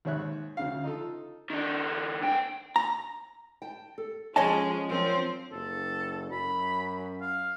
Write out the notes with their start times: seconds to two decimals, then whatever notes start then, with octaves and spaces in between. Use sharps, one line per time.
0.05 D#2 G#2 C#5 E5 F#6
0.57 D2 C#3 F5
0.84 D#4 F4 A4
1.50 D#3 D4
2.22 B3 G5
2.76 A#5
3.62 G5 A5
3.98 A4
4.36 F3 G#3 C#4 C#5 D#5 G#5 A5
4.90 F3 F#3 C4 D4 A#4
5.52 F#1 A4
6.31 F#2 B5
7.21 F5